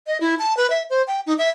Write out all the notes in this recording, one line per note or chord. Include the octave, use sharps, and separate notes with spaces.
D#5
E4
A5
B4
E5
C5
G5
D#4
E5